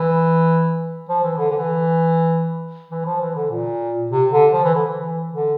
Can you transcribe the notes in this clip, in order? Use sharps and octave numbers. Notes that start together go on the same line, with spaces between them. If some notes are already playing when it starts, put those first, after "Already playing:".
Already playing: E3
F3
E3
D3
D3
E3
E3
F3
E3
D3
A#2
C3
D3
F3
E3
D3
E3
D3